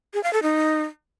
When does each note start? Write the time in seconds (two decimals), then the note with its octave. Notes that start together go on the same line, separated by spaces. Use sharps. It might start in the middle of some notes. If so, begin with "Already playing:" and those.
0.14 G#4
0.24 F5
0.33 A4
0.43 D#4